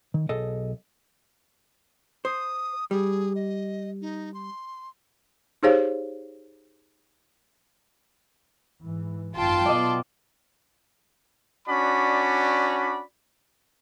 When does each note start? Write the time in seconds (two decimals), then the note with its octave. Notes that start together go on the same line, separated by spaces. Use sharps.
0.14 D#3
0.29 B1 G#4 A4 D#5
2.25 C5 D#6
2.91 G3 G#4
3.35 D#5
4.02 D#4
4.34 C6
5.63 D#4 G4 G#4 C5 C#5 F5
8.82 G#2 E3
9.36 G#1 F#2 D#3 F4 G5 A5 C6
9.66 B2 F#3 B3 D5 D#5
11.68 C#4 D4 F#4 D5 B5